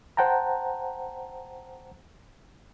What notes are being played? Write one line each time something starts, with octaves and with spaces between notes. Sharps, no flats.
C5 F#5 G5 A5 A#5